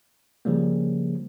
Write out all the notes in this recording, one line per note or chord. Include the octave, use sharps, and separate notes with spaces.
C#3 F3 G3 A#3